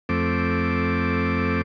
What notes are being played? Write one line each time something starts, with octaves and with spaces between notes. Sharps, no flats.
F2 A3 C4 D6